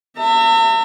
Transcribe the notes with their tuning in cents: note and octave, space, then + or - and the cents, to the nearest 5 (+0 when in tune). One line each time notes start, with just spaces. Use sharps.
E5 +0 A#5 -45